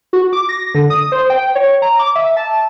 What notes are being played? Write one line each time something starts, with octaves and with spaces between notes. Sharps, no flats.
F#4
D6
A#6
D3
D#6
C5
G5
C#5
A#5
D6
E5
A5